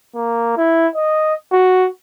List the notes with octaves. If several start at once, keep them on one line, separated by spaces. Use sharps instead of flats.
A#3
E4
D#5
F#4